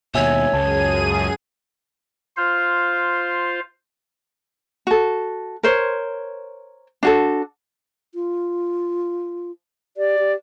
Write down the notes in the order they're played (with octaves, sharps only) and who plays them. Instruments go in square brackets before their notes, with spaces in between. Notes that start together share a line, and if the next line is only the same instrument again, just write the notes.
[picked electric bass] D#2 B2 [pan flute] C#5 [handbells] E5 G#5 E6
[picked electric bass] C#2 [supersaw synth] F#2 G#4 D#7 [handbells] A5
[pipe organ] F4 C5 F5
[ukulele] F#4 A4
A#4 C5 C#5
D4 F#4 A4
[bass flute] F4
[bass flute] G4 [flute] D5
[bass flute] G4